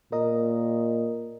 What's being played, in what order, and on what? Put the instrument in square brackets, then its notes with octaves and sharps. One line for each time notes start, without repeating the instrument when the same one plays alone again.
[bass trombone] A#2 [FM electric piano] A#4 D#5